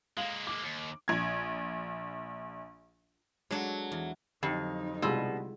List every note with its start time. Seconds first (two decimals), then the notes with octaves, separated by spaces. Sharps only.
0.17 G#3 A#3 F5 F#7
0.47 D6
0.63 D#2
1.08 A#1 G#6
3.51 F#3 G#3 D4 A4
3.92 E2
4.43 F2 D3 F#3 D#4 G4
5.02 C2 B2 G3 G#3 F4 C6 E6